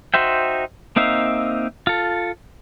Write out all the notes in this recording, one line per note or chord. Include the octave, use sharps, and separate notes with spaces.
D#4 F#4 C5 E5 G5
A#3 C4 D#4 E5 F5
F4 A4